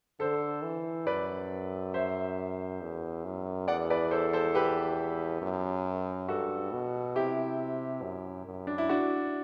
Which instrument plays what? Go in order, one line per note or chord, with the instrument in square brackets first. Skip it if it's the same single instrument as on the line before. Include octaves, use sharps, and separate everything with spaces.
[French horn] D3 [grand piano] A4 C5
[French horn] E3
[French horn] F#2 [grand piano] B4 D5
[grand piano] C5 E5
[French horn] E2
F#2
[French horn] E2 [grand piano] D5 F#5
[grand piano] B4 D5
A4 C5
A4 C5
G4 B4
[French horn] F#2
[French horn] G2 [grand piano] F#4 A4
[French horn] B2
[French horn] C3 [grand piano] E4 G4
[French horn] F#2
F#2
[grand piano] D4
E4
D4 F#4